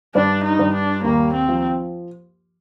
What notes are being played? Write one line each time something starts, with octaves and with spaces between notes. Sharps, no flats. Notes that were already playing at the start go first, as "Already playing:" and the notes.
G2 D4
D#4
G2
D4
D#2 A#3
C4
F3